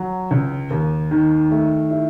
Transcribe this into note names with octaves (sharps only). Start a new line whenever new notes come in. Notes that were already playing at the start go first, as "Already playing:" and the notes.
Already playing: F#3
C#2
D#2
D#3
A3
E4